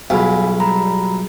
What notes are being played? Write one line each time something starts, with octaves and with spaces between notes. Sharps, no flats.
B1 G3 F4 G#4 F5 G#5 B5
G3 A#5 B5